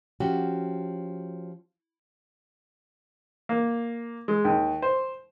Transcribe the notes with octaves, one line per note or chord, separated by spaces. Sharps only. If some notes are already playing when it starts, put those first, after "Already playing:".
F3 C#4 F#4 G4
A#3
G#3
D#2
C5